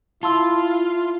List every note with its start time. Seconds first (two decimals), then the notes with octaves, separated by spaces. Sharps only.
0.23 E4 F4 A5 C6 E6